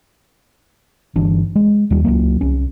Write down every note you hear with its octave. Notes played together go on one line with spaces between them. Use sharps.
G1 E3 D4
G#3
D#2 G3
C#2 F#3 A#3
C2 C#4